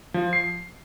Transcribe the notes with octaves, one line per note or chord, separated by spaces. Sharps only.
F3
C7